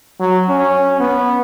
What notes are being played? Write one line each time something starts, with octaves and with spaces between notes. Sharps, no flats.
F#3
C#4
B3